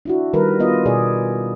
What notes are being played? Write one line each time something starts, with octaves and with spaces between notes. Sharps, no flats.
D4 E4 F#4
D#3 G3 A#4 B4
B3 F4 D#5
B2 G#4 D5